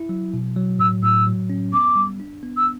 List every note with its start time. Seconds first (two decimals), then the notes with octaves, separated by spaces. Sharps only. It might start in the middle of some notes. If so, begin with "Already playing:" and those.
Already playing: E4
0.09 F#3
0.34 B2
0.56 F#3
0.79 A2 E6
1.02 A2 E6
1.26 F#3
1.50 C#4
1.73 B3 D6
1.96 G3
2.20 D4
2.43 B3
2.57 E6